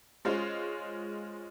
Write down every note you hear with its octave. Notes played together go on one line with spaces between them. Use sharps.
G#3 C#4 F4 C5